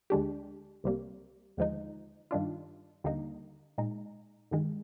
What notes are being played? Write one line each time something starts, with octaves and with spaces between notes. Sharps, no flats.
D2 D3 G#3 D4 G4
C2 C3 G3 A#3
D#2 D3 F3 G#3 D#4
G2 D#3 G3 D4 F4
D#2 D3 G3 A#3 D#4
A#2 G#3 D#4
G2 D#3 G#3